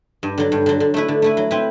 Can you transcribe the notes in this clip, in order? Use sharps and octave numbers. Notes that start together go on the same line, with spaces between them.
G2
D3 F#3
G2
D3 F#3
D3
A3 E4 B4
D3
A3 E4 B4
F#3
C4 E4 B4